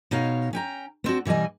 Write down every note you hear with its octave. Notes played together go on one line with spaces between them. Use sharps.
B2 D#4 C#5 F5
C#4 G5 A#5
B3 C4 D4 F#4
B2 E3 G3 D#5 G#5